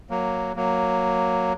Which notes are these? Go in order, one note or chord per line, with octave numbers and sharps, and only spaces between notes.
F#3 A#3
F#3 A#3